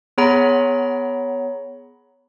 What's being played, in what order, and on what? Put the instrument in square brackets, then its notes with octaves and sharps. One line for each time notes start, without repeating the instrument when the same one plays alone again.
[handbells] B3 G#4 C#5 F#5 A#5 B5